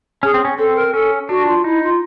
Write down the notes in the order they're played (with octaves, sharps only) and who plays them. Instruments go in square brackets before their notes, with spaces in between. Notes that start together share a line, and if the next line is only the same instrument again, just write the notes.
[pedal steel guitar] C#4 [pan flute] G#4
[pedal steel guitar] C4
C#4
[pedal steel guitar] C4 [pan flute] A4
[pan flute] A#4
[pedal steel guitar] C#4 [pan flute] A4
[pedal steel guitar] D4 [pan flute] F#4
[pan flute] F4
[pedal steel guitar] D#4 [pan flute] E4
[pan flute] F4